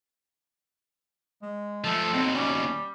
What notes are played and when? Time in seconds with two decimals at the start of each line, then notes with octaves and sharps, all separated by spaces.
1.42 G#3
1.84 F3 A3 A4
2.13 D#2 B2 C4
2.35 G3 C#4